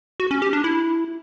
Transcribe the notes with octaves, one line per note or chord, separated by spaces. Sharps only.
F#4
C#4
G4
D4
E4